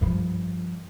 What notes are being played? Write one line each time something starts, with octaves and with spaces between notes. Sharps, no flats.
G2 F3